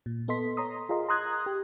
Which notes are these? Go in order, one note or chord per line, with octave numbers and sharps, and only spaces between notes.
A#2
B3 A4 D#5 C6 B6
C#5 A#5 C6 D#6
F4 G#4 A#4 D#5 C6
A#5 C6 D#6 F#6 G#6
G4